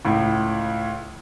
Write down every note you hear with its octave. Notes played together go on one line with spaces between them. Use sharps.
C#2 A2